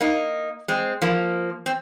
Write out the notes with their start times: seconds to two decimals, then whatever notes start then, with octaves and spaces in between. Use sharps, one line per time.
0.01 A#3 D#4
0.68 G#3 C4
1.02 F3 A#3
1.66 C4